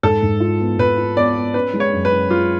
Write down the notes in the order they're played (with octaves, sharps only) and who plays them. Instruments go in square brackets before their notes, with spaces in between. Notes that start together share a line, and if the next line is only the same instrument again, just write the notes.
[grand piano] G#2 [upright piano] A4
[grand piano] G#2
F4
B3
[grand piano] G#2 [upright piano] B4
[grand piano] F4
[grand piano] B3 [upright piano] D5
[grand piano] B3
[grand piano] C#4 [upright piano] B4
[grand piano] G#3
[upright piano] C#5
[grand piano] F#2
[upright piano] B4
[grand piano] C#4
[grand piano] G#3 [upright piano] F4